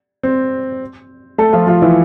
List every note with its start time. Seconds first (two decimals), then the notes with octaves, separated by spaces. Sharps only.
0.23 C4
1.38 A3 A4
1.53 F3 F4
1.67 F3 F4
1.82 E3 E4